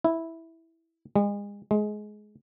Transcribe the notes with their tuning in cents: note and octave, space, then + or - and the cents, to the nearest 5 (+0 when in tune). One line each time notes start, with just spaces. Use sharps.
E4 -5
G#3 -35
G#3 +20